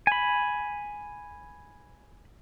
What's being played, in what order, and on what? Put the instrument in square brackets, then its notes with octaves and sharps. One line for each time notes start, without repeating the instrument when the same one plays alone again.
[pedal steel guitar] G#5 B5